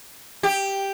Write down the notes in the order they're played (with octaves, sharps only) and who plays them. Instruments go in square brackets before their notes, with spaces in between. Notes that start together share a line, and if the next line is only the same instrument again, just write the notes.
[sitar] G4